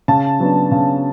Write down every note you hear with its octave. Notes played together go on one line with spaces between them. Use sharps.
C#3 A5
F#3 B3 D4
C#3